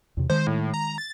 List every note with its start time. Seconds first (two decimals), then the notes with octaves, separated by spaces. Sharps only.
0.17 E2 C3
0.30 D#3 G#3 C5
0.47 A2
0.74 A#5
0.98 A6